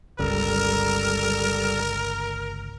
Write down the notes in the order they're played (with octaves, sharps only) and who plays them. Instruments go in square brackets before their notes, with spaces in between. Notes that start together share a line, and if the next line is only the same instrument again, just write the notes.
[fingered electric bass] G1 C#2 C#3 [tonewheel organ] G3 A4 [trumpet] A#4